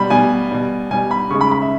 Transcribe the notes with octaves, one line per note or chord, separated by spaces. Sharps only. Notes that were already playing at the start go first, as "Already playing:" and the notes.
Already playing: B2 G3 B5
B2 G3 G#5
B2 G3
B2 G3 G#5
B5
C#3 G#3 C#6
B5
B5
E5